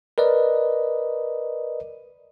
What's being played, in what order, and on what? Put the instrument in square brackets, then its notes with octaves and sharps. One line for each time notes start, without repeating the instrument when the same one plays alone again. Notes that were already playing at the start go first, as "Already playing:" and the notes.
[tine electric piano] A#4 B4 D5 D#5